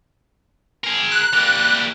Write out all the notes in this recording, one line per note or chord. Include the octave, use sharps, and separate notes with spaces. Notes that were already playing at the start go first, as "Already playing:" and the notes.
G#4 A#4
F#6
G3 A#3